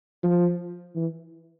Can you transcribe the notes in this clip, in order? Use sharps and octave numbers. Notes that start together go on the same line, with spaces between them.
F3
E3